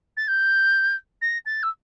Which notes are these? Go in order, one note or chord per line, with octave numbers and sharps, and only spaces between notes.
A6
G6
A#6
A6
E6